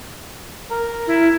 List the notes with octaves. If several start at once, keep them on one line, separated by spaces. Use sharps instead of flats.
A#4
E4